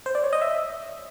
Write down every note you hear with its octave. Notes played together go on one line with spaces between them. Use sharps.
C5
D5
C#5
D#5
E5